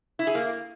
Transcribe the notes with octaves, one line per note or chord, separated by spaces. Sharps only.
E4
G#4
A#3